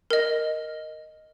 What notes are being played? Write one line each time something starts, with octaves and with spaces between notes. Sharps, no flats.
A#4 D#5